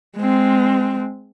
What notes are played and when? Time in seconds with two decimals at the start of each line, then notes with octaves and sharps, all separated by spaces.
0.17 G#3 C4